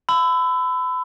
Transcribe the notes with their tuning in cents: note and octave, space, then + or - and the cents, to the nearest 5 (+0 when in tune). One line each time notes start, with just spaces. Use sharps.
B5 +35 E6 +0